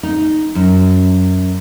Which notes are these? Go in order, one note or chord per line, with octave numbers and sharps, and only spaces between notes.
D#4
F#2